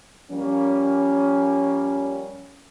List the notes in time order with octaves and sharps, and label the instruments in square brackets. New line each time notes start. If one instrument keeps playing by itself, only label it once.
[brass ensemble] F3 G3 A#3 C#4